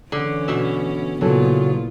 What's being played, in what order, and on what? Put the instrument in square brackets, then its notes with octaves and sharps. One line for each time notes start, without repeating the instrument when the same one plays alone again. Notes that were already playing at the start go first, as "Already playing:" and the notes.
[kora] D3 [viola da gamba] E3 C#4
[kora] B2 E5
[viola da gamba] A#2 B3 F4 [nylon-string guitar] C#3 F#3 A4 [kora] E3